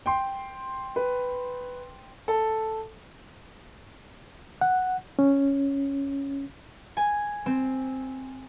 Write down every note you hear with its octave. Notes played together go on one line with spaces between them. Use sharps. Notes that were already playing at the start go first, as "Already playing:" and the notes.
G5 C6
B4
A4
F#5
C#4
G#5
C4